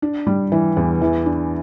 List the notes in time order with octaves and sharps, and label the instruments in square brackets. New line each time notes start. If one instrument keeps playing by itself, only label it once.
[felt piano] D4
G3
E3
E2
E3
D4